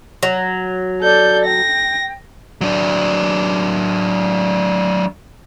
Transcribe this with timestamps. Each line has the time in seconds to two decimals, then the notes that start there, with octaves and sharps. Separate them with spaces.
0.23 F#3
1.02 A4 D5 G6
1.45 G5 A#6
2.61 F#3 D4